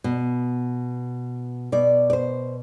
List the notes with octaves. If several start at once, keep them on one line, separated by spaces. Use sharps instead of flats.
B2
B2 D5
D5
C5